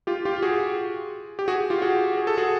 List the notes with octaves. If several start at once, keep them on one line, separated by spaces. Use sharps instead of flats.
F4 G4
F4 G4
F#4 G#4
G4
F#4 G#4
F4 G4
F#4 G#4
G#4
A4
F#4 G#4